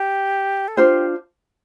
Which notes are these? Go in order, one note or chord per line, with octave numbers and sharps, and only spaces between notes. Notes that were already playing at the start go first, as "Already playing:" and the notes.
Already playing: G4
A4
D4 F4 G4 C5